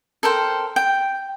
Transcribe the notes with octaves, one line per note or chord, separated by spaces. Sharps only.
A4 A#4 C5 G5
G5